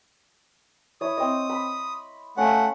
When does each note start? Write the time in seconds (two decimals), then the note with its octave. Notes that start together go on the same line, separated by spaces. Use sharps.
1.01 E4 C#5 D#6
1.18 C4 D#5
1.50 B5
2.37 A3 C#4 F5 F#5